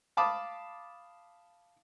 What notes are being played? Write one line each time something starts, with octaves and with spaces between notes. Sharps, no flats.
F5 A5 B5 D6 D#6